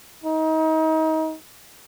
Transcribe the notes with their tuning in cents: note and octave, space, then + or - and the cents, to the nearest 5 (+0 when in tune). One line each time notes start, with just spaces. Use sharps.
D#4 +30